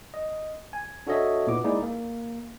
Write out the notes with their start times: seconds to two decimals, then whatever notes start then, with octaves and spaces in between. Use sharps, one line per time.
0.14 D#5
0.73 G#5
1.07 D4 F#4 A4 C#5 D#5 E5
1.47 A#2 B3 E4 D6
1.64 G#3 A#3 D#4 E4 G#4 D5
1.82 A#3